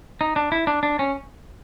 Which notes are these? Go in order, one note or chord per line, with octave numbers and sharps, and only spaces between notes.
D#4
D4
E4
D4
D4
C#4